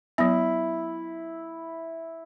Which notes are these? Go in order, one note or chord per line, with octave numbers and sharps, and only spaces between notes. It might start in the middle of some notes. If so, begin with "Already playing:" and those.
F#3 B3 E4